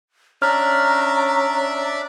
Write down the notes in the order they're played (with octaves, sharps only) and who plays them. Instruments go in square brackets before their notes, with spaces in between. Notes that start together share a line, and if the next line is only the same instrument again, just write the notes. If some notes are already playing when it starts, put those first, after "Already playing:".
[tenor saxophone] C#4 [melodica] D4 D5 E5 [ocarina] A#5 [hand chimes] F6